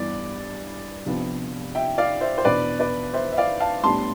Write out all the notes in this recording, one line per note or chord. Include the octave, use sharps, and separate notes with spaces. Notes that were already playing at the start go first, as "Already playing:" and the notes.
Already playing: G2 E3 B3 D5
C3 F3 B3 D4
E5 G5
D5 F5
C5 E5
C5
E2 B2 B3 D4 B4 D5
B4 D5
C5 E5
E5
D5 F5
F5 A5
A2 G3 B3 D4 A5 C6